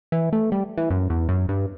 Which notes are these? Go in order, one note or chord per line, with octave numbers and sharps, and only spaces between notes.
E3
A3
G3
E3
F#2
E2
F#2
G2